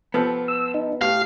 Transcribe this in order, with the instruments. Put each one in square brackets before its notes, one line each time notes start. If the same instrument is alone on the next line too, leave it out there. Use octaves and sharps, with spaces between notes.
[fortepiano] C3 F3 A4 [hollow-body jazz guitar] B3
[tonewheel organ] E6
D#4
[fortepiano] A2 [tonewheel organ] G4 [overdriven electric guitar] F5